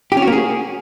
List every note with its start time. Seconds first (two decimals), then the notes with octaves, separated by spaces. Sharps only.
0.12 G4
0.17 C#4
0.22 F#4
0.27 A#3
0.33 G#4